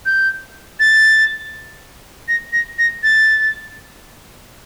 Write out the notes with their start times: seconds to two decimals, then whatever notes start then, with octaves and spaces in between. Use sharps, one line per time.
0.06 G6
0.80 A6
2.28 A#6
2.53 A#6
2.79 A#6
3.03 A6